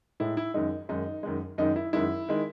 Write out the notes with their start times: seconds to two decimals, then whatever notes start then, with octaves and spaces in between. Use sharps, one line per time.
0.20 A2 G#3 E4
0.37 E4
0.54 F#2 D#3 G#3 D#4
0.89 F#2 D#3 G#3 D#4
1.23 F#2 D#3 G#3
1.58 F#2 D#3 G#3 D#4
1.76 E4
1.93 F#2 D#3 G#3 E4
2.28 D#3 G#3